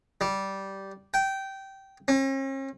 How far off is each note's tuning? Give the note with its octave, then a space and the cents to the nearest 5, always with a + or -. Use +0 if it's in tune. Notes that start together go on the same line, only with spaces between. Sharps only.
G3 -10
G5 -15
C#4 -45